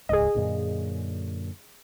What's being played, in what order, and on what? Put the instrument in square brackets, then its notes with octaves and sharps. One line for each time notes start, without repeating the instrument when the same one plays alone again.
[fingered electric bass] D#1 C#2 G#2 [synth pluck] G#4 D#5
[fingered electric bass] F#2 A#2 D3